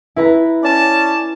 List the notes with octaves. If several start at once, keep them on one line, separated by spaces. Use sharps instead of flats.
E4 B4 A#5
C#4 D5 A5